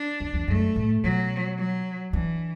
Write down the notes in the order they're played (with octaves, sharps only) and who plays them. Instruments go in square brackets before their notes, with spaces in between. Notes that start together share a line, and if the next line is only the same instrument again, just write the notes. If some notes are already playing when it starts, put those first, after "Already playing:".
Already playing: [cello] D4
[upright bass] E2
E2
[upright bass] F#2 [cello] A3
[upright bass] A2
[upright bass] B2 [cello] F#3
[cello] F#3
[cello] E3 [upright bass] D4